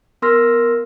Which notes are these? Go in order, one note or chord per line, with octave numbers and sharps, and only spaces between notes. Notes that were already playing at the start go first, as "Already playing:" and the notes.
B3 A#4 C6 E6 F6 A#6